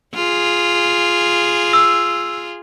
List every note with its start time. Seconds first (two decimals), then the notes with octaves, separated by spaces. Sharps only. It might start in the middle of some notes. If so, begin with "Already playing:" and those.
0.15 F4 G#4
1.73 E6